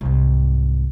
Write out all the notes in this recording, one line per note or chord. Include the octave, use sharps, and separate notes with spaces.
C2 G#2